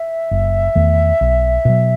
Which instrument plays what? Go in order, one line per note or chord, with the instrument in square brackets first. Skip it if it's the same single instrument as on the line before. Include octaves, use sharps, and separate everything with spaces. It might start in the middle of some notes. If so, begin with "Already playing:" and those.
Already playing: [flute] E5
[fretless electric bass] F#1
E2 D#3 A3
B1
B2 F#3